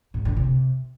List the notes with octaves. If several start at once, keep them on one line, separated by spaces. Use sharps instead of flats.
G#2
D3
C3